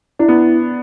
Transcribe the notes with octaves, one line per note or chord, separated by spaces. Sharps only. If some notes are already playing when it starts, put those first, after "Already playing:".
D4 E4
B3